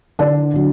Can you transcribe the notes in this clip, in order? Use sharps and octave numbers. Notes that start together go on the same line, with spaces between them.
D3 D4
D3 F#3